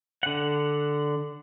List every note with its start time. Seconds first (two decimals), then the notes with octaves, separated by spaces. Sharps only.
0.23 D3 F#5